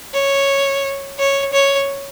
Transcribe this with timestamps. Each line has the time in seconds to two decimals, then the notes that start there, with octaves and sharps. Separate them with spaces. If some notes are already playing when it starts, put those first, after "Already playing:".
0.14 C#5
1.19 C#5
1.53 C#5